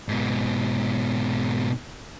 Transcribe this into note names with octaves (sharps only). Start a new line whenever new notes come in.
G#2 B2